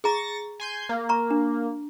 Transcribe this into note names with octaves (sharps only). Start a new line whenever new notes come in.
G#4 A#5 C#6 A6 A#6
G#5 C6 G6
A#3
A#5 C#6
D4